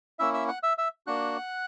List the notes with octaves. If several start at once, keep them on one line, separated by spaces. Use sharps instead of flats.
A#3 C#4 E4 E5 E6
E5 E6
F#5 F#6
E5 E6
E5 E6
A#3 D4 F#4 F#5 F#6